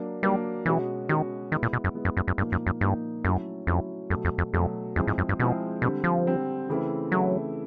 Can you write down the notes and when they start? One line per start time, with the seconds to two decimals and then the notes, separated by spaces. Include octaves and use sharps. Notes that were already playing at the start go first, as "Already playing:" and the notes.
Already playing: F#3 A#3 D4
0.23 F#3 G3 A#3 D4
0.65 B2 E3 G#3 C#4 F#4
1.09 B2 D#3 G#3 C#4 F#4
1.52 D#3 G#3 B3 E4
1.63 A#2
1.73 B2
1.84 F#2
1.95 G#3 B3 E4
2.05 F#2
2.17 F#2
2.27 F#2
2.38 G2 A#2 F3 A#3 D#4
2.52 F#2
2.67 F#2
2.81 G2 A#2 F3 A#3 D#4
3.24 F#2 F#3 A3 C#4 E4 A4
3.67 F2 F#3 A3 C#4 E4 A4
4.10 F#2 B2 F#3 A3
4.25 F2
4.38 F2
4.53 F2 B2 F#3 A3
4.96 F2 F3 G#3 C4 E4 G#4
5.07 G#2
5.18 F#2
5.29 G2
5.39 B2 F3 G#3 C4 E4 G#4
5.82 B2 D3 G3 C4
6.04 F3
6.25 D3 G3 C4
6.69 C#3 E3 A3 C4 E4
7.12 C#3 E3 F#3 A3 C4 E4